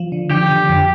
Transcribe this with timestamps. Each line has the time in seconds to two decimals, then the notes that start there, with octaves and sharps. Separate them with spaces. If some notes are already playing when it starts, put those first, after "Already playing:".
Already playing: F3
0.12 D3
0.30 D3 G4
0.50 D3
0.69 F2